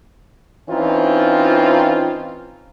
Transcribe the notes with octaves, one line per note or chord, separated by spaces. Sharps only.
E3 C4 C#4 D#4 F4